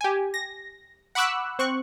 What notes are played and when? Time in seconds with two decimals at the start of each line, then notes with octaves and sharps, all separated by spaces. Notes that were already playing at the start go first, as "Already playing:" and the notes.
0.01 G4 G#5
0.34 A#6
1.15 F#5 B5 C#6 D6 E6 F#6
1.59 C4 C#6 F#6